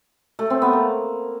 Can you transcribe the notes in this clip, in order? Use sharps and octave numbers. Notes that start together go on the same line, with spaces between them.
A3
C4
B3
A#3